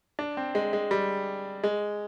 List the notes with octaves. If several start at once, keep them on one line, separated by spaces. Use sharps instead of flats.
D4
C4
G#3
G#3
G3
G#3